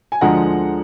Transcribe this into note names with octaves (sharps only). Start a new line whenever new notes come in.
G#5
D2 D3 F3 G#3 F#5 A#5